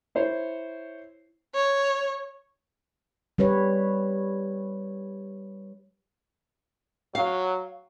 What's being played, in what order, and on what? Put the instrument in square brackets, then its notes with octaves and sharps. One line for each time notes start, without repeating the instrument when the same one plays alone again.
[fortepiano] E4 C5 C#5
[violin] C#5
[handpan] G3 G4 B4 C#5
[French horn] F#3 [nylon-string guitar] F5